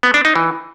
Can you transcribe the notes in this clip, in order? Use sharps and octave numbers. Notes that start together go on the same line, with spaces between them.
B3
D4
D#4
E3